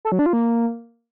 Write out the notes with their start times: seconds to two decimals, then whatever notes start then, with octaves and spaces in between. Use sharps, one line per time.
0.05 A4
0.12 F#3
0.19 D4
0.26 F4
0.33 A#3